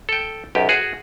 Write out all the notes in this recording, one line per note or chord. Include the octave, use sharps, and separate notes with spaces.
A4 G5
B1 F#2 G4
F#4 G#4